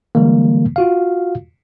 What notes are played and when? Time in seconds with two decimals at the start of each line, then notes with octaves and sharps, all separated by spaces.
0.15 D3 E3 G3 G#3 A#3
0.76 F4 F#4 F5